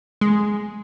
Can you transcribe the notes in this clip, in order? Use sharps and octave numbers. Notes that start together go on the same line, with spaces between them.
G#3